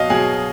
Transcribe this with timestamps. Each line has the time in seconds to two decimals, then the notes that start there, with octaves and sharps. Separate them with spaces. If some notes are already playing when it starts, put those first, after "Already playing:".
Already playing: B2 F#3 D#5 F5
0.10 B2 F#3 G#4